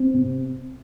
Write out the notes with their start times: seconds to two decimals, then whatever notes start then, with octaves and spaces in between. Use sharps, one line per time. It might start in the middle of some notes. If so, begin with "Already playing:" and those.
Already playing: C4
0.14 C3